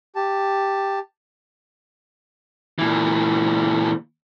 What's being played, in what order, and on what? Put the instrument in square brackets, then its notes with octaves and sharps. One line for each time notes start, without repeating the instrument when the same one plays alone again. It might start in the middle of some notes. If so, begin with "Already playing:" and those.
[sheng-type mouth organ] G4 A5
[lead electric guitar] A#2 E3